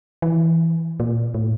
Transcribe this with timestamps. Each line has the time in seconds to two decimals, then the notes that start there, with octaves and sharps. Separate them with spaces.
0.22 E3
1.00 A#2
1.34 A2